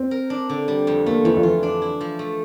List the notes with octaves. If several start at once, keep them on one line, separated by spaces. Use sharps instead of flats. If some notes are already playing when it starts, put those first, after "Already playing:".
Already playing: C4
A#4
D4
D3
G3
F2
A3 A#3
F2 E3
F3
E3 F4
D4
E4
F3
A3